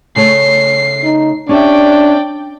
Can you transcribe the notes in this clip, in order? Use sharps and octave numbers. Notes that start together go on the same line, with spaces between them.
C#3 A3 C#5 C7
D#4
C#4 D4 G4 D5 E5 G5